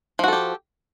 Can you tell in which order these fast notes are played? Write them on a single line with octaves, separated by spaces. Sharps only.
F3 F#4 A4 G4